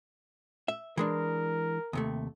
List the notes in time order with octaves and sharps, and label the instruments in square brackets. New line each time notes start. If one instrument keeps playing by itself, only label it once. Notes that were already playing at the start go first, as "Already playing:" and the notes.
[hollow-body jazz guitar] E5
[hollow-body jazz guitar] E3 G#3 D4 [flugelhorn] A#4
[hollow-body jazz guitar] D#2 C3 A3